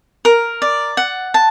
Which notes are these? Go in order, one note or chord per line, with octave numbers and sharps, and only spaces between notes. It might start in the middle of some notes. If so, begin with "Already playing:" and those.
A#4
D5
F#5
A5